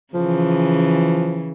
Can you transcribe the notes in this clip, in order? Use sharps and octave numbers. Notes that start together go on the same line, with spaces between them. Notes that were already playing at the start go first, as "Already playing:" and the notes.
C#3 E3 F3